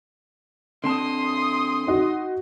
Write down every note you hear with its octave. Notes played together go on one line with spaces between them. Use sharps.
D3 C4 A5 C6 D#6
D#4 F#4